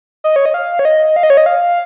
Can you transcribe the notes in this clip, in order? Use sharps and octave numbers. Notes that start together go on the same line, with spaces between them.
D#5
C#5
D#5
F5
C#5
D#5
F5
D#5
C#5
D#5
F5